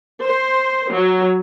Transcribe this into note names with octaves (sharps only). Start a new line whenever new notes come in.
C5
F#3